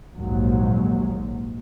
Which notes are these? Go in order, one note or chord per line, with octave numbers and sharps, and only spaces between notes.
A#1 D#2 G#2 F#3